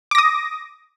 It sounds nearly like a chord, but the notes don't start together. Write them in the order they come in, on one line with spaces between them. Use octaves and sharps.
D6 A#6 D#6